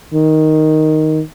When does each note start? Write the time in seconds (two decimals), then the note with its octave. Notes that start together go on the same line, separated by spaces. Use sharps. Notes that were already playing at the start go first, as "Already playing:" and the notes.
0.13 D#3